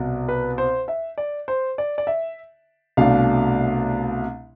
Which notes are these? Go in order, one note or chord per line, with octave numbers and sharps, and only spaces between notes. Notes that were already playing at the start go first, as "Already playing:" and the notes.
Already playing: C2 B2
B4
C5
E5
D5
C5
D5
D5
E5
C2 B2 A3 D4 F5